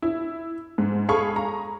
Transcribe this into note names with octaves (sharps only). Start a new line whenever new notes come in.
E4
G#2
G#4 A4 F5 B5 C#6
A#5